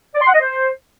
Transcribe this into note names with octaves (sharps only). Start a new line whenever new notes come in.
D5
C6
F#5
D#5
C5